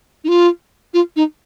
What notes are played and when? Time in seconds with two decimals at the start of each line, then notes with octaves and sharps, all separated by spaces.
0.24 D#4
0.28 F4
0.94 F4
1.16 D#4